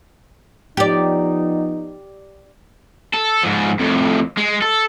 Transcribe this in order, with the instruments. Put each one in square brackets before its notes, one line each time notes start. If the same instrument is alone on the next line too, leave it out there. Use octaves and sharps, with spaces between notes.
[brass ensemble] F3 B3 D#4 [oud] G4 D5
[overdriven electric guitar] A4
G#2 F3
F2 A2
G#3
A4